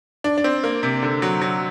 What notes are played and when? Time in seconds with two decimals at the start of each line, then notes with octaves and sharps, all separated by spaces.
0.24 D4
0.38 D4
0.44 C4
0.64 A#3
0.83 C3
1.03 D3
1.22 F#3
1.42 F#3